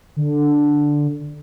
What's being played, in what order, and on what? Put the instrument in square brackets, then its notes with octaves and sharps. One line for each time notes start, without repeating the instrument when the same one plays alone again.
[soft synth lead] D3